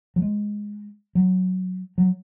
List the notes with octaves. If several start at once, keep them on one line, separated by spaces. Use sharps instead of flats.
F#3
G#3
F#3
F#3